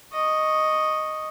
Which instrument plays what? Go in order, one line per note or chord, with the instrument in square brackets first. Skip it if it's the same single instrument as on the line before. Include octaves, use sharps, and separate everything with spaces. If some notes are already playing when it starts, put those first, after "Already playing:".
[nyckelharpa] D#5 C#6